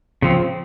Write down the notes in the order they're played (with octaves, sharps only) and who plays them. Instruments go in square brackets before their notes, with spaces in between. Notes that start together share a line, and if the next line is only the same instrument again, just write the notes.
[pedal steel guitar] C#3 F3 C4